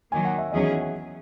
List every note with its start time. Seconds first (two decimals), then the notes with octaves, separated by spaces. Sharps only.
0.11 D#3 F#3 A#3 G#5
0.25 F#5
0.38 E5
0.52 E2 D#3 F#3 C#4 G#4 D#5
0.62 E5
0.72 F#5
0.81 G#5